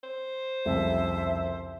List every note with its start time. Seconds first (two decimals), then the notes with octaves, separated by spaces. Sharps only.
0.04 C5
0.65 C2 F2 C#3 E5